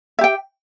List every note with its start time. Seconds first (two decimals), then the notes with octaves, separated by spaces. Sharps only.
0.19 E5
0.21 G4
0.24 G5